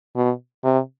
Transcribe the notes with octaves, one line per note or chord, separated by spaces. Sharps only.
B2
C3